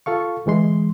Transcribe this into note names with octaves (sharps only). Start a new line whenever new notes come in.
F4 A4 F5 C#6
D2 E3 G#3 C6